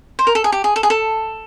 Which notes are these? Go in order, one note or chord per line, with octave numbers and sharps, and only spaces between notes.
C5
A#4
A4
G#4
G4
G#4
A4
G#4
A4